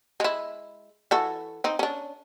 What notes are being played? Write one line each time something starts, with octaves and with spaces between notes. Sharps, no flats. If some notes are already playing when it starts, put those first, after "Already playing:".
G#3 E4
E3 F#4 A4
C4 D#4
C#4 D4